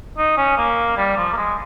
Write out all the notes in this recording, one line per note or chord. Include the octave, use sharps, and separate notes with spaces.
D#4
C#4
A#3
G3
F3
A#3
G#3